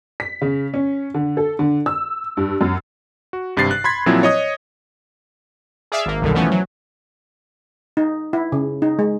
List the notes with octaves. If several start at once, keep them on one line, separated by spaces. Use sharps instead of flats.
B6
C#3
C#4
D3
A4
D3
E6
G2
F#2
F#4
G#1 G2 C3 A6 C7
F#6
B5 C6 G#6 B6
A#2 F3 F#3 C4 E4
C#5 D#5 D#6
G#4 D5 E5 F5
G#1 A#3
C2 F#2 B2 D3 D#3
E3 F3 A3 B3 C#4
F#3
D#4
E4
C#3
D#4
G#3